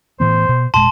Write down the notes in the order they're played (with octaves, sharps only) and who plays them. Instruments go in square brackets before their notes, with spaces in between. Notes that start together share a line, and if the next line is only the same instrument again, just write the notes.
[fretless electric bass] A2 E3 B3 [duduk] C5
[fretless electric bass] B2
[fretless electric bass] E1 A#2 G#3 [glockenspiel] A5 C6